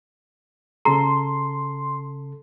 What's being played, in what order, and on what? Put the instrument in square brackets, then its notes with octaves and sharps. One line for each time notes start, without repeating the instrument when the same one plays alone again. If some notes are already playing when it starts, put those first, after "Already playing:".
[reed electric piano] C#3 A4 [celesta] A#5 [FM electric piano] C6